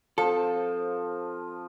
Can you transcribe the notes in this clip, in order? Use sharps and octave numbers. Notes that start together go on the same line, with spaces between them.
F3 C4 A4